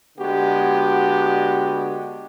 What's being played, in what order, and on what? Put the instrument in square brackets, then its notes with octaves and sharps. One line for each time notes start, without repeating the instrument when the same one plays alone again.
[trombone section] D3 G#3 B3 F#4 G4